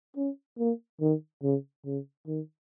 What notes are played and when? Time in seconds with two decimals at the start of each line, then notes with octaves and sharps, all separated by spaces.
0.16 C#4
0.58 A#3
1.01 D#3
1.43 C#3
1.85 C#3
2.27 D#3